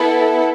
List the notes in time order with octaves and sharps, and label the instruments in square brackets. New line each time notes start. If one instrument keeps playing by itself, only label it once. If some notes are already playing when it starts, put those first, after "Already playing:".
Already playing: [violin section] B3 E4 A4